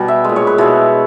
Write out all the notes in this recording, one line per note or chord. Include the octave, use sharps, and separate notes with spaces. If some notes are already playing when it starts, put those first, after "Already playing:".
Already playing: B2 G3
E5
A#2 G#3
C#5
B4
B2 G#3 E4